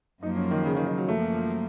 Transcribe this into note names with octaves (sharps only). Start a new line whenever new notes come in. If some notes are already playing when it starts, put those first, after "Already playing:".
F#2 F3 A#3 D#4
C#4
D#3
C#3
D#3
D#3
F#3
F#2 F3 A3 A#3